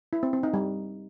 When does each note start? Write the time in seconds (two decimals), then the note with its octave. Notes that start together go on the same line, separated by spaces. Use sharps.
0.13 E4
0.23 C4
0.33 C4
0.43 D#4
0.54 G3